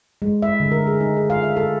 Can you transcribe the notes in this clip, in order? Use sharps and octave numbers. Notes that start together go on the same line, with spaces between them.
G#3
E5
D3
A#4
G#4
D#4
G#4
F5
E5
A4